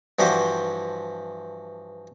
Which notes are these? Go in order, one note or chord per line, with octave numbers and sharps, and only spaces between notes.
G2 E3 F3 F#4 G4 C5